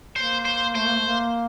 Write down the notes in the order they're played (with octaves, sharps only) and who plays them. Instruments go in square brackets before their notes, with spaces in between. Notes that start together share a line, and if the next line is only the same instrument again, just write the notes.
[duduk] A#3 [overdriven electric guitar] C5
[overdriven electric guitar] C5
[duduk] A3 [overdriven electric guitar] C5
[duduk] A#3
A3
A#3